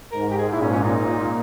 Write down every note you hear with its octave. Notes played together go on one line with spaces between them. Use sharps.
G#2 A#4
G4
G#4
A#2 E4
C#4
C#4
D#4
A#2